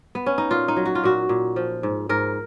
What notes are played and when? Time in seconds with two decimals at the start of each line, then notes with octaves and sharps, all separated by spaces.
0.15 B3
0.26 C#4
0.38 D#4
0.50 A#2 F4
0.68 D#4
0.76 F#3
0.85 F#4
0.95 F4
1.03 A#2 F#4
1.29 A#2
1.56 F3
1.83 G#2
2.09 G#2 A#4